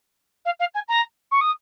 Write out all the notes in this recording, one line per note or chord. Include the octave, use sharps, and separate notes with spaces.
F5
F5
G#5
A#5
C#6
D#6